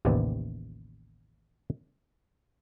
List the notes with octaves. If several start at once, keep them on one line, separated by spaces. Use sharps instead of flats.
A1 D#2 C3 B3 C4 D5